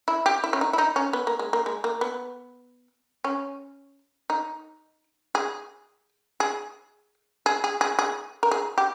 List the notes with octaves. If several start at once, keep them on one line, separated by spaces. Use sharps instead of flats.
E4
G4
E4
C#4
D#4
E4
D#4
C#4
B3
A#3
G#3
A#3
G#3
A#3
B3
C#4
D#4
G#4
G#4
G#4
G#4
G#4
G#4
A#4
G#4
G4